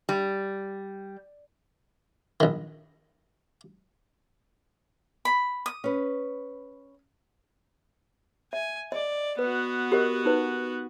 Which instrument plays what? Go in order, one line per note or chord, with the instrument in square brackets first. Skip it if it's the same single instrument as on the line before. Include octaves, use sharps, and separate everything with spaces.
[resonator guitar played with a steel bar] G3
[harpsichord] A#1 D#3
[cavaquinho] B5
D#6
[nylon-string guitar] C#4 B4
[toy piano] E5 [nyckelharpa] G#5
[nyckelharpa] D5 [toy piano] D#5
[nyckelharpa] B3 F#4 [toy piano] B4
[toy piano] G4 A#4 D#5
D#4 B4